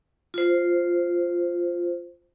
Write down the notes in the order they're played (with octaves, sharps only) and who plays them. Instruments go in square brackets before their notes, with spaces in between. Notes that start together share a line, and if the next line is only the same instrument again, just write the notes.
[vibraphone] F4 C5